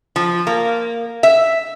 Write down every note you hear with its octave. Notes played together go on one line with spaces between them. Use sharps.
F3
A#3
E5